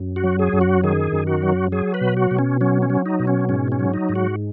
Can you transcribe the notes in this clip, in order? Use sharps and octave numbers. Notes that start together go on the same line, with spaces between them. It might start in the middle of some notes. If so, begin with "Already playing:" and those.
Already playing: F#2
F#4
F#3
G#4
F#2
F#4
D#3 G#4
F#2
F#4
F#3
F#3 G#4
B4
B2
F#4
B2
C#4
F#3 C#4
C#4
F#3
D#4
B2
C#4
G#2 C#4
C#4
F#3
D#4
G#2
F#4